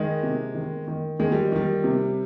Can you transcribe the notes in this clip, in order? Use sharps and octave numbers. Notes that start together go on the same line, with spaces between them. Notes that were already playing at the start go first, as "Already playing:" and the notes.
Already playing: D#3 G#3
C3
D#3
D#3
D#3 G#3
G3
D#3 G3
C3